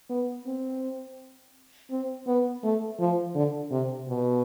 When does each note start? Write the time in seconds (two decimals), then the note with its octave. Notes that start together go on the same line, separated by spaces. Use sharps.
0.10 B3
0.46 C4
1.91 C4
2.27 B3
2.64 A3
2.99 F3
3.35 D3
3.71 C3
4.08 B2